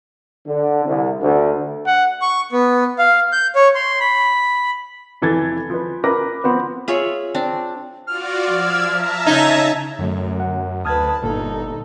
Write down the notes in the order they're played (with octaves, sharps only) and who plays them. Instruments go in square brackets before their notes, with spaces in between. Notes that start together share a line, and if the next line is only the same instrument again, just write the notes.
[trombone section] D3
C2
D2
[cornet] F#5
[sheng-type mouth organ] C#6
B3
F5
G6
C#5
C6
B5
[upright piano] F1 E3 A4 G#6 A6
F3 B4
A#4 B4 A#5 D6 A#6
F3 B3 C4 B4
[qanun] F4 G#4 C#5 E5
C4 D4
[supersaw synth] F4 F#4 D5 [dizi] F6
[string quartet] F3 [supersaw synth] D5 E6 G#6
[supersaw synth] E5 A5 A#5
[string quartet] C#3 G#6 [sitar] D#4
[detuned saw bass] F#2 [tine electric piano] D3 F#3 A3
[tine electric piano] F#5
[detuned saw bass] D2 [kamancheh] B4 A5 [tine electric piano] D#6 F6 G#6
[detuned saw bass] G1 [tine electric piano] A#2 D3 A#3 [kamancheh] D#4 A4